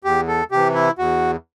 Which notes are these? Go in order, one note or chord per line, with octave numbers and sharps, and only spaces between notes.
E2 G4
A4
C3 E3 G4
E4
E2 F#4